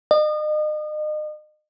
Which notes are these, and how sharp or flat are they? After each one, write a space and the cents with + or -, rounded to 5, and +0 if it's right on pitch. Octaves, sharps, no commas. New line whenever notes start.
D#5 -35